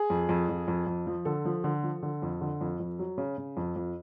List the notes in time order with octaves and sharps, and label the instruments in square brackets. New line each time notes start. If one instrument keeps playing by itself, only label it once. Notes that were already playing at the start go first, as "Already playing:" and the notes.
Already playing: [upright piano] G#4
F2
F2
F2
F2
F2
F3
D3 A4
F3
D3
F3
D3
F2
D3
F2
F2
F#3
C#3
C#3
F2
F2